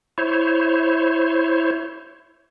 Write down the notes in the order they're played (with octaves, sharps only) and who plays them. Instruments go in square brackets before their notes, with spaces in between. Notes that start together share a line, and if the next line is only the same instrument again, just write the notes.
[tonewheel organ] E4 C5 C#5